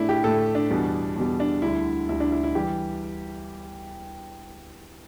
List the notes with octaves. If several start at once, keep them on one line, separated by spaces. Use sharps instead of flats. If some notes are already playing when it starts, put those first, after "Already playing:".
Already playing: A2 A3 D4 E4
G4
A2 A3 A4
D4
E2 B2 G3
E2 B2 G3
D4
D2 D3 G3 E4
D2 D3 G3 E4
D4
E4
E4
E3 G3 G4